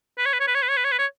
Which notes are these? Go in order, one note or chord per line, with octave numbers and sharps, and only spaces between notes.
B4
C#5
B4
C#5
B4
C#5
B4
C#5
B4
C#5
B4
C#5